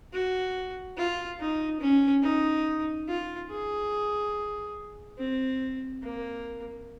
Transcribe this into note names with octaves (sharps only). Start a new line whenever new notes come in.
F#4
F4
D#4
C#4
D#4
F4
G#4
C4
A#3